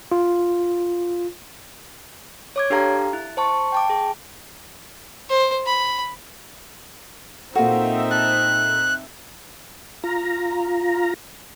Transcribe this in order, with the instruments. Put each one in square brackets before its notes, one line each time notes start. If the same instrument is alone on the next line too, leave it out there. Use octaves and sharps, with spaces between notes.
[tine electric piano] F4
[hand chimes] C#5 D6 G#6
D4 G4 A4 F5 A#5
E4
C5 A5 C#6
G5 A5 D6
G#4
[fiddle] C5
B5
[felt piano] A#2 A4 [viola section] C4 D#4 E5 [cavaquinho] F4 F#4
[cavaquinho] A5 [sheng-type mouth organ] F#6
[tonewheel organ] F4 A#5